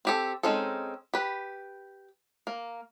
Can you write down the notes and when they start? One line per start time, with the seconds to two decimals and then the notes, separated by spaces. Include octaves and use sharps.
0.05 C4 G4 A4
0.43 G#3 C4 C#4 D#4 A4
1.14 G4 B4
2.47 A#3